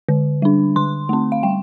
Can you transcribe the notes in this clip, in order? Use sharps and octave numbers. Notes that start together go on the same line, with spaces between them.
D3
G3 D4
D3 C6
A3 C4
F5
G3 G5